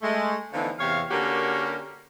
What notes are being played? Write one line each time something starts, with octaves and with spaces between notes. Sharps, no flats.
G#3 A3
D3 E3 F3 A3 B3 D#4
E2 C3 C#5 F5
D3 A#3 C#4 F#4 G4 A#4